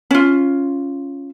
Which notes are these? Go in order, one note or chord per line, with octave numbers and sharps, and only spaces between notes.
C#4 F4